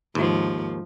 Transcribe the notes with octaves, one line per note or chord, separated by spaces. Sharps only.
D#2 G#2 F3